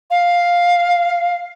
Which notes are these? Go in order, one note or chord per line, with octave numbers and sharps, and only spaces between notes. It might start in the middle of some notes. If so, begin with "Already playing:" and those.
F5